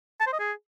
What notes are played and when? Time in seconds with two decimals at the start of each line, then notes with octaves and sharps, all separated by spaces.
0.21 A5
0.27 C5
0.33 D#5
0.39 G#4